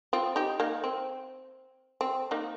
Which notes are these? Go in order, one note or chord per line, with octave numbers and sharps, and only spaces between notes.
C4 F4
D#4 G4
A#3 D#4
C4
C4
A#3 D#4